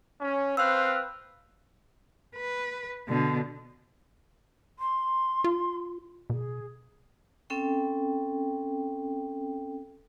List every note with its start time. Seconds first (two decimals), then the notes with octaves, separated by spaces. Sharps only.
0.21 C#4
0.57 C4 B4 F5 E6 F#6
2.36 B4
3.08 B2 D3
4.79 C6
5.44 F4
6.30 B2 G#4
7.50 C4 C#4 A4 G5